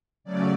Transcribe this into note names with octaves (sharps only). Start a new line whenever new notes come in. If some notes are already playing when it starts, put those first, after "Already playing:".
C#3 F#3 A3 C#4 D5